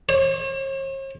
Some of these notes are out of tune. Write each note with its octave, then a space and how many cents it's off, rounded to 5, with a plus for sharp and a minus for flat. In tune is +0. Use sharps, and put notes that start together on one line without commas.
C#5 -45